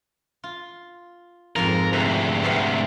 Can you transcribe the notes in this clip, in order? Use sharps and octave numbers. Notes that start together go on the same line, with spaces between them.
F4
F2 G#2 F3 A#4
D2 C3 B4
D2 C3 B3 C4 F5